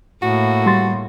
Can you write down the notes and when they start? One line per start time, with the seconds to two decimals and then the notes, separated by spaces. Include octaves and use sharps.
0.22 A2 A#3 F#4
0.66 G3 C6 A6